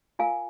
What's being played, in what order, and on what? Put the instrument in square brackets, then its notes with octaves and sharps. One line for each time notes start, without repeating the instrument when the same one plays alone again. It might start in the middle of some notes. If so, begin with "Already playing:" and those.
[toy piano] F4 A#4 F5 G#5